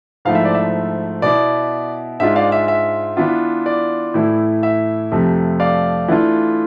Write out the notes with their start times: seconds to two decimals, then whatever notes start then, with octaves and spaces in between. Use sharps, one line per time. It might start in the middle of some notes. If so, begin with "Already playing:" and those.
0.25 G#2 F3 A3 E4 F5
0.35 E5
0.45 D5
0.55 E5
1.22 B2 B3 E4 D5
2.20 G#2 G#3 D4 F4 E5
2.36 D5 F5
2.52 E5
2.68 E5
3.17 E3 B3 D4 F4
3.66 D5
4.14 A2 E3 A3 E4
4.63 E5
5.12 F2 C3 F3 A3
5.60 D5 F5
6.08 E3 A3 D4 F4